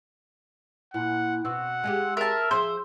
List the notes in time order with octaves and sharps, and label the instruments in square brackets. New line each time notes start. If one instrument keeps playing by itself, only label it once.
[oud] A#2 [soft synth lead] E4 [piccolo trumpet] F#5
[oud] B2 C4 F#4 [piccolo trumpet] F#5 [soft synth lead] E6
[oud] G#3 F4 G4
[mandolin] A#4 A5 [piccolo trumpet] E5
[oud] F3 G#4 [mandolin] C5